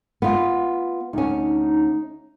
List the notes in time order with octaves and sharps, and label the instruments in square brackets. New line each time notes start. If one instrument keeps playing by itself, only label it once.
[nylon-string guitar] B3 F4
[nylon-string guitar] D2 C#4 [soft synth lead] D#4